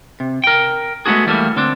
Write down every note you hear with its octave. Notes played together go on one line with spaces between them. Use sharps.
C3
A#4 G5
G#3 A3 B3 D4 F#4 G#4
E3 G3 A3 A#3
D3 C4 D4